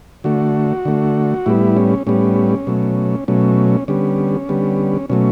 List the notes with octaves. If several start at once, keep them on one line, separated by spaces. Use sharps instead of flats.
D3 A3 F#4
D3 A3
A2 G3 B3 E4
C#4
A2 G3 B3 C#4
B2 F#3 A3
B2 F#3 A3 C#4
D3 G3 B3 C#4
D3 G3 B3
B2 F#3 A3 C#4